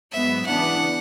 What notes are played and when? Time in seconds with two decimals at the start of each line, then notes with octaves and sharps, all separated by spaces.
0.12 G#2 F#3 B3 E5
0.46 C#3 E3 B3 D4 F#5